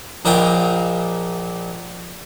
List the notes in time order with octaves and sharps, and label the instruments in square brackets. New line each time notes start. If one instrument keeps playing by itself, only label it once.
[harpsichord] A#1 A#2 A#4 D#5 F5 G5